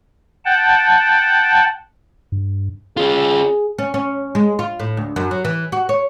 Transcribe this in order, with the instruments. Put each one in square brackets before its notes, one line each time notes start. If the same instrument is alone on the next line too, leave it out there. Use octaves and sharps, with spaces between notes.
[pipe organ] F#5 G5 A5
[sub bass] G2
[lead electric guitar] C#4 F4 [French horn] G#4
[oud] C#4
C#4
G#3
F4
A2
D2
F#2
F#3
E3
F#4
C#5